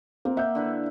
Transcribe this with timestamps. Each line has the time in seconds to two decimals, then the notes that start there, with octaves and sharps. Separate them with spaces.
0.25 A#3 C4
0.37 E5 F#5 G6
0.55 D3 E4 B4